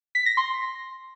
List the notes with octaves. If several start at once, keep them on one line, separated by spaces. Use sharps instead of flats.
B6
A#6
C6